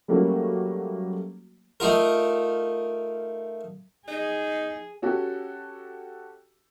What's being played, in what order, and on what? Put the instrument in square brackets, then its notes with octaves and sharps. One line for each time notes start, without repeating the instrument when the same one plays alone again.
[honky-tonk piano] F#3 G3 A3 A#3 C#4 F#4
[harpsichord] A3 D#4 F4 A#4
[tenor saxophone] D#4 [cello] G#4
[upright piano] C#4 F#4 G4 A4